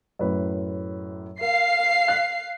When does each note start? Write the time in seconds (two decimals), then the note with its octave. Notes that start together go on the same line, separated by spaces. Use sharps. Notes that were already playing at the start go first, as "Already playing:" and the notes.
0.19 F#2 A2 B4
1.41 A#4 F5 C7
2.08 F#6 B6